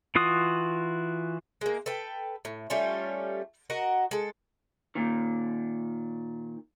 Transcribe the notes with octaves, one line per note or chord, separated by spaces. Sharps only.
E3 F4 F#4 D#6
G#3 A#3
A4 B4 G5
A2
G3 A3 C#4 F4
F#4 A#4 D#5 F#5
G#3 A4
A#2 D#3